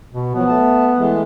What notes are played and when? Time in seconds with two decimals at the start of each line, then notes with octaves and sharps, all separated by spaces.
0.12 B2
0.35 F3 F#3 B3
0.48 A3 A5
0.97 E3 G#3 A3